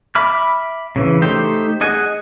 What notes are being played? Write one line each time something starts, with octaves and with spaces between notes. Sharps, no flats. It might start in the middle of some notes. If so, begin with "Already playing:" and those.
E5 B5 D6 F6
C#3 E3
A3 D#4 G4 C5 G5
G#4 D#5 F#5 G#5